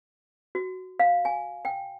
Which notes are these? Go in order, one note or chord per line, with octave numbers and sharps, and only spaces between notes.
F#4
F5
G#5
G5